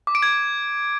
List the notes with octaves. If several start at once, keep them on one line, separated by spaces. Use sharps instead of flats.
D6
D7
G#6